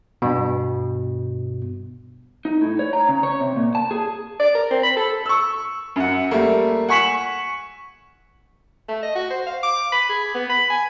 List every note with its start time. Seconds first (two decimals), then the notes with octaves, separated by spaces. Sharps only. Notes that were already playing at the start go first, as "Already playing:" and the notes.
0.22 G2 B2
2.45 D#4
2.61 A2
2.79 C#5
2.93 A#5
3.08 C#3
3.23 C#5
3.40 C3
3.56 A#2
3.75 A5
3.91 G#4
4.40 D5
4.55 A#4
4.71 C4
4.83 B5
4.96 A4
5.26 C#6 E6
5.96 F#2 F#5
6.31 G3 A3 A#3
6.89 F#5 G#5 C#6 B6 E7 F#7
8.89 A3
9.03 D#5
9.15 F#4
9.30 C5
9.47 F5
9.63 D6
9.92 B5
10.09 G#4
10.34 B3
10.49 B5
10.70 G#5